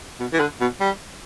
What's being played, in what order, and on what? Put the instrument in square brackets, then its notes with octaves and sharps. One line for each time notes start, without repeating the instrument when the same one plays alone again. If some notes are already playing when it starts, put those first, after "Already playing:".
[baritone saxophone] B2
E3
D3
B2
G3